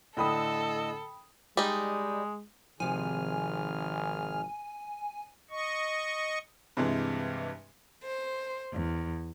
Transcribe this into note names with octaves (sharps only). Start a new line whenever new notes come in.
A2 D3 A4 D#5 G5 B5 D#6 E6
G3 G#3 D#4
G#1 C3 D#3 F3 G#4 G#5 F6
D#5 C#6
G2 C3 E3 G#3
C5
E2